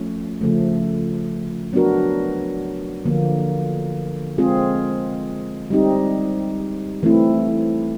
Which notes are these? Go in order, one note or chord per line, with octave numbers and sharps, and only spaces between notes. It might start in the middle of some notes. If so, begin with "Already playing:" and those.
Already playing: F3 A3 C#4
C#3 F3 A3
F#3 B3 D4 F#4 A#4
D3 F3 A#3
G#3 C4 F4 G#4
G3 C4 D#4 G4
E3 A3 C4 E4